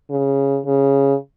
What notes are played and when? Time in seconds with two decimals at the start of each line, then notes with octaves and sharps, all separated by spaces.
0.10 C#3
0.65 C#3